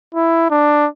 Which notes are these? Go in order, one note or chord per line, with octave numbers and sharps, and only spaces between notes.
E4
D4